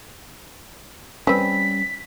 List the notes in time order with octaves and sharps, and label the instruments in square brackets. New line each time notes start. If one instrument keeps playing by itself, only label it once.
[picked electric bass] G3 C#4 [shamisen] C4 B4 [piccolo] B6